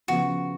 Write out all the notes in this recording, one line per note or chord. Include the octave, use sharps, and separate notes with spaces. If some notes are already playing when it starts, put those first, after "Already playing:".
C#3 F3 B3 F#4